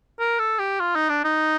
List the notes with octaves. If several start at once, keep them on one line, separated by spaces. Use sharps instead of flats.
A#4
A4
G4
F4
D#4
D4
D#4